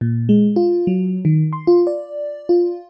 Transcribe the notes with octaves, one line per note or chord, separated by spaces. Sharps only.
A#2
G#3
F4
F#3
D#3
C6
F4
D5
F4